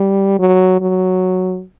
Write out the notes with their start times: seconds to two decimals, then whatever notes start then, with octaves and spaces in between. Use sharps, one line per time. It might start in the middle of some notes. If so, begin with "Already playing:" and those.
Already playing: G3
0.39 F#3
0.81 F#3